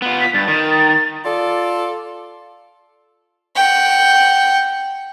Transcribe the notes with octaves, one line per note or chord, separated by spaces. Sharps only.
B3 F4
B6
G2 A6
D#3
F4 A4 D5
F#5 G5